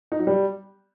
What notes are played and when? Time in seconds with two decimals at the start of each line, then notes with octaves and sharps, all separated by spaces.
0.12 D#4
0.19 F#3
0.27 G3